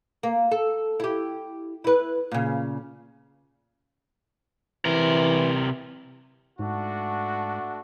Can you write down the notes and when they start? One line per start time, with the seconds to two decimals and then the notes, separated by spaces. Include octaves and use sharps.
0.23 A#3
0.51 A4
1.00 E4 G4
1.84 E4 B4
2.31 A#2 C#3
4.85 C3 E3 A#4
6.59 G#2 A3 D4 F#4